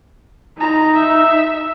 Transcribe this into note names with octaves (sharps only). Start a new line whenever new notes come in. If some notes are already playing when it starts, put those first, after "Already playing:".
D#4 A#5
E5